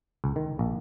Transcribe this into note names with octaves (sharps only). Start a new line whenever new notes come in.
C#2
D#3
A#1